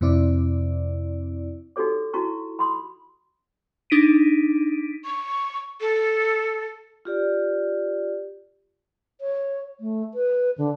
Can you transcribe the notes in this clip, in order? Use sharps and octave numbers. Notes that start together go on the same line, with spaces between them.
F2 C3 C4 E4 D5
D#4 F#4 G4 A4 C#5 D6
D#4 E4 F#4 A5 A#5 C#6
B5 C6 D#6
D4 D#4 B6 D7 D#7
C#6
A4
F4 G4 D5
C#5
A3
B4
D3